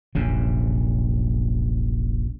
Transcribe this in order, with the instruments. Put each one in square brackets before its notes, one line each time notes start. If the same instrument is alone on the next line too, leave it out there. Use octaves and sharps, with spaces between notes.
[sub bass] D#1 [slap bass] A#1 F#2 C3